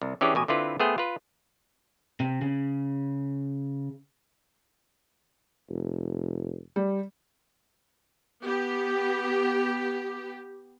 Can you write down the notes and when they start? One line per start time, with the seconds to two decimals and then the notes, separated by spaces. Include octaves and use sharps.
0.02 C2
0.21 E3 C#4 D4 G4 G#4
0.35 A1 B2 G#5
0.48 D3 C4 E4 F4 B4
0.80 A3 B3 G#4 C5 G5
0.98 F4 B4
2.20 C3
2.41 C#3
5.69 F1
6.76 G3
8.42 B3 G4